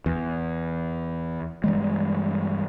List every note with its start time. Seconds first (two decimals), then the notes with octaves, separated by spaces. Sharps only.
0.06 E2
1.64 G2 E3 G#3